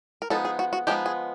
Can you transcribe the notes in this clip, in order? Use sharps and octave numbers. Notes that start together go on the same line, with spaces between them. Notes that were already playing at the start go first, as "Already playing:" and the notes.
A#4
F3 G#3 B3 D#4 A4
G#4
F#4
F#4
F3 G#3 B3 D#4 G4
G#4